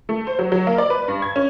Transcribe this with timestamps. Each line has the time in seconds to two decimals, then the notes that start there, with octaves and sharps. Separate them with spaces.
0.09 A3
0.27 C5
0.39 F#3
0.52 F#3
0.67 A#3
0.78 D5
0.90 B4
1.08 G2
1.22 G#6
1.36 C#4